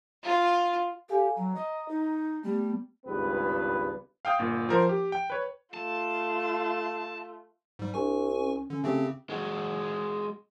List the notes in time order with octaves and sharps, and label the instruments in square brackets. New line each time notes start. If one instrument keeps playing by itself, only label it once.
[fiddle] F4
[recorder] G4 [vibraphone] A4 F5 G#5
[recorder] F#3 [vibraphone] A#5
[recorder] D#5
D#4
[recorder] G3 [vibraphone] A3 B3
[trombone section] G#1 C#2 G2 B3 B4
[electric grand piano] F5 G5 D#6 G6
G1 A#2
F3 A#4 C5
G4
G5
B4 C#5
[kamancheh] A3 F4 [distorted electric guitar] A5
[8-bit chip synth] G#2 G3
[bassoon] C2 [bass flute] D4 [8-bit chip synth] G#5 C#6
[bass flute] C#4
[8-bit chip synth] D3 [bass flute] C#4
[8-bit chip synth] C#3 C4 G4 [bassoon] A3
[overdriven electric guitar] G#3 F#4